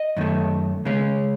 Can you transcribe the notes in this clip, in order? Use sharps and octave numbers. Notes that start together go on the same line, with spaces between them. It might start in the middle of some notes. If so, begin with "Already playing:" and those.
Already playing: D#5
F#2 D#3 A3
C#3 G#3 C#4